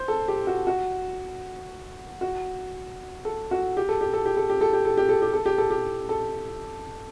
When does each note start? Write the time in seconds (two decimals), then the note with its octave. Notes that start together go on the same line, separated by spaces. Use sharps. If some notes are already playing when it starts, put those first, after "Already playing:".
Already playing: C5
0.08 A4
0.28 G4
0.47 F#4
0.67 F#4
2.21 F#4
3.25 A4
3.51 F#4
3.77 G4
3.89 A4
4.01 G4
4.14 A4
4.26 G4
4.37 A4
4.49 G4
4.61 A4
4.73 G4
4.85 A4
4.97 G4
5.09 A4
5.22 G4
5.33 A4
5.46 G4
5.58 A4
5.70 G4
6.09 A4